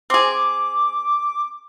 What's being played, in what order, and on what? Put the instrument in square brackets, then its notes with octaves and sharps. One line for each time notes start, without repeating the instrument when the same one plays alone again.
[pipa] C4 G#4 [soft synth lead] D6